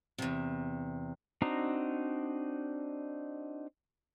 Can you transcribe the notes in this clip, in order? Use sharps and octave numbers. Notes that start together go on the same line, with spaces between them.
E2 C3
C4 D4 D#4 F#4 A#5